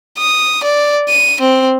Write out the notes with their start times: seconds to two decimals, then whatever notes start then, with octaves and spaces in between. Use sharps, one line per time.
0.18 D#6
0.63 D5
1.09 D#7
1.41 C4